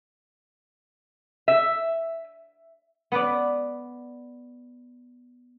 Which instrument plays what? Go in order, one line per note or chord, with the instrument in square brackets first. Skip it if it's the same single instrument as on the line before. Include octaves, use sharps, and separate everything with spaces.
[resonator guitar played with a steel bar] E5
[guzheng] B3 B4 D5